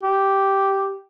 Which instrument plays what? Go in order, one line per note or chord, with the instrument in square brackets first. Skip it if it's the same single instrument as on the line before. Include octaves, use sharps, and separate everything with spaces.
[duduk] G4